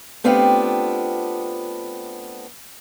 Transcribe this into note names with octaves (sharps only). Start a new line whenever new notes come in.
A3 B3 C4 D4 F4 G4